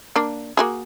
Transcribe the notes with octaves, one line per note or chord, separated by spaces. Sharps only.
A#3 D4
A#3 F#4 G#4